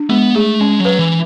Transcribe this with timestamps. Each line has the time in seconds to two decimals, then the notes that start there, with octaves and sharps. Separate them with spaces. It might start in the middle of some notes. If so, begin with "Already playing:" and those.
Already playing: D4
0.09 G#3 B3
0.35 A3 G#4
0.60 G#3 C#4
0.80 F#3
0.85 B4
0.99 E3